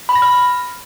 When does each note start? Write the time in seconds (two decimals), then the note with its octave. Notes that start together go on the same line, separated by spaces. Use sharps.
0.09 B5
0.16 A#6
0.22 F6